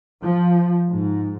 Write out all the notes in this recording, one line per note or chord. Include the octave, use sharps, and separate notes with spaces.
F3
G#2